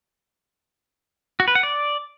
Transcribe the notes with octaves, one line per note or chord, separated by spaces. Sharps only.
F#4
B4
F#5
D5